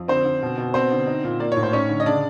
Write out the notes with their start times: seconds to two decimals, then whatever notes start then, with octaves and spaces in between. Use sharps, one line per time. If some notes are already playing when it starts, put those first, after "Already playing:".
Already playing: F2
0.08 D3 C4 C5
0.25 D3
0.42 B2
0.58 B2
0.74 B3 C4 C5
0.92 D3
1.07 D#4
1.24 A#2
1.40 A#3 D5
1.52 C#5
1.57 A2
1.63 C5
1.73 C#4 D#4 C#5
1.89 D3
2.00 D#5
2.06 C#3 D4 D5